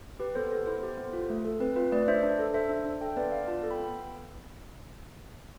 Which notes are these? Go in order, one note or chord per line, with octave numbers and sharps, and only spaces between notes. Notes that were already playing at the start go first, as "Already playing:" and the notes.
G4 B4
B3 A4 C5
B3 A4 C5
E4 A4 C5
G4
B3
F4
A3
A4
C4 B4
F4 B4
A3 B4 D5
D5
D4 C5 E5
D4
A4
A4 C5 E5
D4
D4
A4 E5 G5
B3 B4 D5
B3 D5 F5
F4 F5 A5
A4
G5 B5
B3